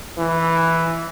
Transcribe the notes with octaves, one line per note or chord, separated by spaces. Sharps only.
E3